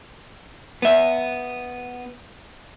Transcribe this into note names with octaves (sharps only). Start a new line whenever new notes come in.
B3 E5